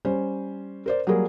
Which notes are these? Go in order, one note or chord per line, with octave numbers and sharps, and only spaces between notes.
G3 C#4 C5
A#4 C5 D5
F#3 G3 A#3 G#4 A#4